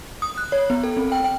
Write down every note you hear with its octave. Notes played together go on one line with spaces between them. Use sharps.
D#6
F#6
C#5
B3
A4
C4
G5
G5